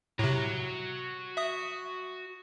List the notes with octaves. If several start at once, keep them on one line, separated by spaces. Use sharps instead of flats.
A2 C3 F#4 A#5
E5 D#6